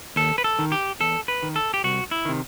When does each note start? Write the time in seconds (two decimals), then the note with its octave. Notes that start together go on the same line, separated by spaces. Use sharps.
0.16 D#2 A4
0.38 B4
0.44 A4
0.59 D#3
0.72 G4
1.00 E2 A4
1.28 B4
1.43 D#3
1.56 A4
1.74 G4
1.84 C2 F#4
2.11 E4
2.25 C3 D#3